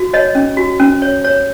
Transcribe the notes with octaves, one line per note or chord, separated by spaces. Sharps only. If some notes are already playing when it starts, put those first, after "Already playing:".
Already playing: F#4
C#5 D#5
C#4
F#4
C#4
C#5
C#5